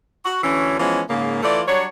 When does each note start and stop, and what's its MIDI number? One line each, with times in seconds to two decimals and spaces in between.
0.24 0.39 66
0.43 0.74 38
0.43 0.74 52
0.43 0.74 61
0.79 1.01 52
0.79 1.01 53
0.79 1.01 56
0.79 1.01 59
0.79 1.01 61
1.08 1.42 44
1.08 1.42 49
1.08 1.42 58
1.43 1.61 52
1.43 1.61 57
1.43 1.61 65
1.43 1.61 74
1.67 1.84 54
1.67 1.84 55
1.67 1.84 62
1.67 1.84 73